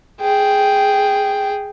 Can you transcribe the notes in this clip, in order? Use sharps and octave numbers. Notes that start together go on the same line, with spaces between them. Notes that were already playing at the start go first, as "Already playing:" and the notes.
G#4 G5